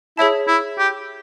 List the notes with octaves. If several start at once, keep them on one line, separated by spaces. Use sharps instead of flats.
E4 G#4 C#5 E5 A5
E4
G4